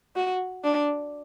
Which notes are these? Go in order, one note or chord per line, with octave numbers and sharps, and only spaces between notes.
F#4
D4